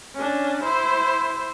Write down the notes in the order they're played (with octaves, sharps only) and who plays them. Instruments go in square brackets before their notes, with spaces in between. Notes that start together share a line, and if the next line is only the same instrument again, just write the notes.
[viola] C#4 D4
E4 C5